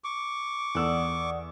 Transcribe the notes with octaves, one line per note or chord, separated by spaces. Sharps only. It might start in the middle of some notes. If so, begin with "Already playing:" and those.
C#6 D6
E2 A4 D5 F#5 D#6 E6